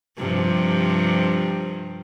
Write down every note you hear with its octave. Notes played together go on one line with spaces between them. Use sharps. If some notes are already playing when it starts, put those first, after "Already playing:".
G2 C3 F3